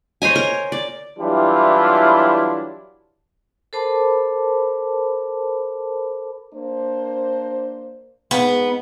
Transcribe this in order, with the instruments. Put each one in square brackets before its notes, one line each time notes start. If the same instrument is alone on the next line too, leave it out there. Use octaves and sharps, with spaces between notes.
[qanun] C5 C#5 D#5 G#5
A#4
D5
[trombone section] E3 F#3 G3 D4 E4 F4
[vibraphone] A4 A#4 C5 A5 B5 D6
[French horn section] A#3 D4 C5
[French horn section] G#2 [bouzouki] B3